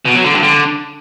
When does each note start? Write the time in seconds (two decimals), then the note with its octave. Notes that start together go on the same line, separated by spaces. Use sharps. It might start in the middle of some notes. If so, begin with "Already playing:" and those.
0.05 B2
0.15 F#3
0.24 D3
0.34 G2
0.43 D3